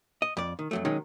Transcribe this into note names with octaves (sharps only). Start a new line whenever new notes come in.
D#5
F2 D5
D#3
F2 F#3 A3
D#3 F#3 G#3 C#4 D#4